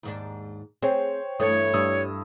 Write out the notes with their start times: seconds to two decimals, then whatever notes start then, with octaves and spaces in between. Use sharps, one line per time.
0.03 D#2 G#2 D4
0.82 C4 G#4 C5 C#5 G5
1.40 G2 E3 A3 C#5 D#6 G#6
1.74 G2 G3 D#6 E6